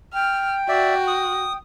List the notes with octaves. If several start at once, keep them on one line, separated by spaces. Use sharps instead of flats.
G5 F6
F#4 D5 E5
D#6